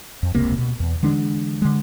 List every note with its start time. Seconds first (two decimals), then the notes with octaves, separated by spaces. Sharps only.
0.23 F2
0.35 E1 C#2 C3 A#3
0.58 B2
0.80 E2
1.03 D3 E3 G#3 D4
1.62 D3 G#3